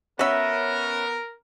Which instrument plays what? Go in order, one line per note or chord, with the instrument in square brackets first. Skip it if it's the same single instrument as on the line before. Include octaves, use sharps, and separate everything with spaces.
[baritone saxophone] B3 [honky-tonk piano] C#4 [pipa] F#4 E5 [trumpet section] A#4